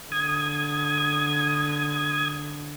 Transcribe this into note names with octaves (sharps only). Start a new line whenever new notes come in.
D3 D#6 G#6